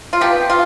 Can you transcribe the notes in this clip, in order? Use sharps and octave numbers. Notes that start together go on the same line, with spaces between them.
F4
C3 F3 B3 G4
F4